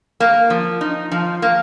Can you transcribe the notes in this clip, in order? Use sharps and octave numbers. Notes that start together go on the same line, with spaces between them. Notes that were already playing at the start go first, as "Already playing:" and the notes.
A#3
F3
D#4
F3
A#3